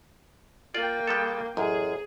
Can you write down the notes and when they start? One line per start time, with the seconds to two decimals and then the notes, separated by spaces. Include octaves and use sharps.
0.74 A#3 F4 D5 G5
1.07 G3 G#3 A4
1.57 A1 F#2 G#4